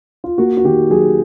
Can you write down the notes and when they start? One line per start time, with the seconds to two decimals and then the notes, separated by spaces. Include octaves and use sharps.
0.24 F4
0.38 A#3 F#4
0.57 F#4
0.64 D#3 G4
0.90 F#3 G#4